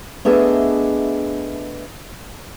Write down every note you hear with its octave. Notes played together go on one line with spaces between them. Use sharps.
A3 B3 D4 G#4 D#5 E5